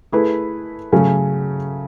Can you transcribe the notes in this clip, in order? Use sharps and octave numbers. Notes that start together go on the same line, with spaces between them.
A3 E4 G#4 B4
C#3 F#3 A3 C#4